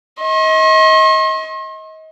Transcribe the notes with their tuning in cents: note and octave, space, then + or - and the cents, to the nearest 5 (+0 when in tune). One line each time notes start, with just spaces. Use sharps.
D#5 +30 C6 +45